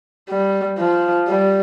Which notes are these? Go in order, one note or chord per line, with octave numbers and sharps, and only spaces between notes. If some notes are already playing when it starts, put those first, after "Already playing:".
G3
F3
G3